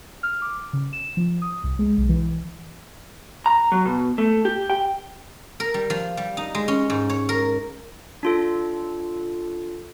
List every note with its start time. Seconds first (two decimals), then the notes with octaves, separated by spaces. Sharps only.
0.23 F6
0.42 D6
0.73 C#3
0.93 E7
1.17 F3
1.42 D#6
1.64 C2
1.79 G#3
1.98 B1
2.09 E3
3.46 A#5
3.72 F#3
3.85 B2
4.18 A3
4.45 G4
4.70 G5
5.60 A#4
5.74 G3
5.90 F3
6.17 G3
6.37 D#4
6.55 G#3
6.68 C#4
6.90 G#2
7.09 C#5
7.29 A#4
8.23 D4 F4 A4